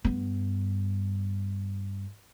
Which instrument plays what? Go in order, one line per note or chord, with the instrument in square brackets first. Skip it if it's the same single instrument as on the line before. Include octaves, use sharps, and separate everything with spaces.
[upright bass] G2 B3